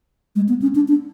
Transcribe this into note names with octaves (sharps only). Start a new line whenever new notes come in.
G#3
B3
C#4
D4
D4